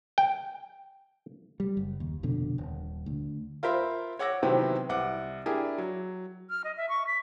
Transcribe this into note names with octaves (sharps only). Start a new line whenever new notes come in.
G5
G3
F#1
D#2
F1 F2 B2 D3
D#1
D2
F4 A#4 C5 E5 B5 C6
C#5 F#5 D6 E6 A#6
C3 D#3 E3 F#3 B3 C4
C2 F#5 D6
D4 E4 G4 G#4 A#4
F#3
F6
D#5
E5
C#6
B6